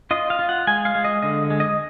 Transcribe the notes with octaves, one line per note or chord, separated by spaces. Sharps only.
F4 D#5
F5
F4
F#5
G#3 G#5
F5
G#3
D#5
D3 D#5
G#3
D#5